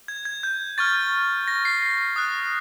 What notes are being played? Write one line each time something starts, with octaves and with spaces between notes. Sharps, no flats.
G#6
G#6
G6
C#6 F6 A6
A#6
C7
C7
D#6 F#6